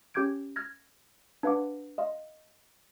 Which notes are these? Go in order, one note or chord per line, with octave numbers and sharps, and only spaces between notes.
C#4 G4 D6 G6 G#6 D7
F6 G#6 A#6
D4 B4 F5 F#5 D6
D#5 F5 C6